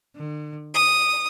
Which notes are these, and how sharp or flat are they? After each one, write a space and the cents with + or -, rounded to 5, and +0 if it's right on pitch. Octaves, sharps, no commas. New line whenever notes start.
D3 +40
D#6 -5